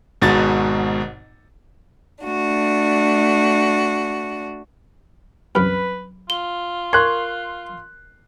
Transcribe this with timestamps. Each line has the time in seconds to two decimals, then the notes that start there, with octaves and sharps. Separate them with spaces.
0.22 G#1 G#2 B2 A6
2.25 A3 D4 F#4
5.55 C2 F#2 B4 B5 F6
6.30 F4 G7
6.93 A#4 C6 C#6 F#6 G#6